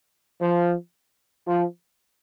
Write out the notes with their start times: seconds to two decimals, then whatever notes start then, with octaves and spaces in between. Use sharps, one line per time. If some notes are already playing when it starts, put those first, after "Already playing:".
0.41 F3
1.48 F3